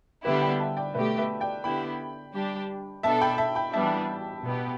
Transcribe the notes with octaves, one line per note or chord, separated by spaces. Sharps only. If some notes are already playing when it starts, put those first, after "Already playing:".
D3 G3 B3 E4 G4 B4 E5
D5 G5
E5 A5
D5 G5
B2 A3 G4 B4 E5
B4 E5
D5 G5
D3 B3 E4 G4 G5 B5
G3 D4 G4
B2 B3 D4 A4 E5 A5
G5 B5
E5 A5
G5 B5
E3 G3 B3 D4 E5 A5
B2 B3 G4